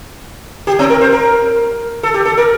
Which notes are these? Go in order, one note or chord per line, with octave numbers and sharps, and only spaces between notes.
G4
C4
A#4
C5
A#4
A4
G4
A4
A#4